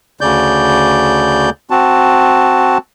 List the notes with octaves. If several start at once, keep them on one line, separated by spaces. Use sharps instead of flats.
D2 C#3 D5 G6
C4 F#4 A5